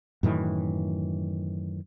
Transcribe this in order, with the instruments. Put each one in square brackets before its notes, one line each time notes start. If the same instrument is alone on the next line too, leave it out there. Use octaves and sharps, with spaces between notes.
[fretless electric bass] F#2 A2 D#3 E3